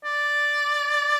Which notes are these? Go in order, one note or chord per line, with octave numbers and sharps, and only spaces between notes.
D5